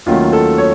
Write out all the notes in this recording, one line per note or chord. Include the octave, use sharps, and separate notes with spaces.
D#2 D#3 F#3 A3 C#4 F4
A4
C#5